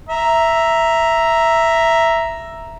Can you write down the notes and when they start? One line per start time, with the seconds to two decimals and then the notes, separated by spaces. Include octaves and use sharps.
0.09 E5 A#5